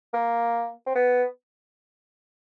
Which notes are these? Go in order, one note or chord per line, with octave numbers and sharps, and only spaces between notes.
A#3
C4
B3